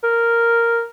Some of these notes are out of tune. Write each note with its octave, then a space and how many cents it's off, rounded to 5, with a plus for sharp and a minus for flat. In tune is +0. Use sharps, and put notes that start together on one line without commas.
A#4 -5